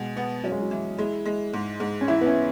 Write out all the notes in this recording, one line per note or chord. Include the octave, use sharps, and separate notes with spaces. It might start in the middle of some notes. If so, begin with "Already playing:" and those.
Already playing: B2 G#3
B3
F#3 C#4
G#3
F#3
E3
G#3 E4
G#3
G#2
G#2
C#4
E3 E4
B3
C#4